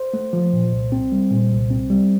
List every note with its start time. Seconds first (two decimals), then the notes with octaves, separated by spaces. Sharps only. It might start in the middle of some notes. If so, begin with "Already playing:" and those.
Already playing: C5
0.14 A3
0.33 F3
0.53 A#2
0.72 C2
0.92 C4
1.12 G3
1.31 A#2
1.51 C2
1.71 C4
1.90 G3